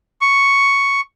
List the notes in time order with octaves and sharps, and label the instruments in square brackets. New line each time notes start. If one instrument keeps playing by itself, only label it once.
[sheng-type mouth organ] C#6